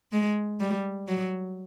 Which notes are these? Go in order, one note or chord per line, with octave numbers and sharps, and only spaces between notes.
G#3
G3
F#3